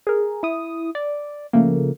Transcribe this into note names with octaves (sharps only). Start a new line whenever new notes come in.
G#4 A#4
E4 D#6
D5
C#3 F3 A3 A#3